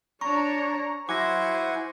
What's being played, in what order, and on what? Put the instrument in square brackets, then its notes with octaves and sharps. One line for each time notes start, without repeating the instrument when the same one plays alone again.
[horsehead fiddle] D4 C#5 [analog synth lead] A#5 [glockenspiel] C#6
[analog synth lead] F#3 [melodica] E4 F#5 G#5 [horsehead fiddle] C5 [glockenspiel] D6 A#6